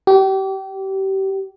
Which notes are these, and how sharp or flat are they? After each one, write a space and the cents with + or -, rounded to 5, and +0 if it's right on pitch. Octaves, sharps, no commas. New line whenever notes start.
G4 -30